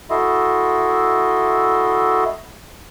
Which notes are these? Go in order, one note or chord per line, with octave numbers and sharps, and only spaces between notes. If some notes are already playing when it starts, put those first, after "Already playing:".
E4 F#4 A4 D#5 E5 C6